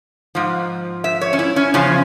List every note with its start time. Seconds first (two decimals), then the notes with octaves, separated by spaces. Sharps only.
0.35 G#2 F3
1.04 E5
1.21 C#5
1.33 C#4
1.39 E4
1.56 C#4
1.74 E2 C#3 F3 C#4